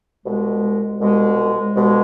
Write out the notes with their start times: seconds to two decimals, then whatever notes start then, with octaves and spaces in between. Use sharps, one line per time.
0.23 C2 B2 G#3
0.99 C2 B2 G#3
1.74 C2 B2 G#3